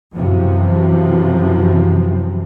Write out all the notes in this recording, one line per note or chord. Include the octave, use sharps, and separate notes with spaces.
F#2 C3 E3 F3